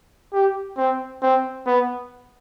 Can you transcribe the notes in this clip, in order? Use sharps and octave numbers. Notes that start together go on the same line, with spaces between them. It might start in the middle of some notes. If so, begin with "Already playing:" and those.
G4
C4
C4
B3